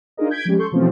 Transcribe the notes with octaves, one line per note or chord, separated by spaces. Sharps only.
D4 D#4 F4 G#4 A#4 D#5
G6 G#6 B6 D7
F3 G3 G#3 C#4 G4
A4 C6 C#6 G6
B2 E3 F3 A3 C4 C#4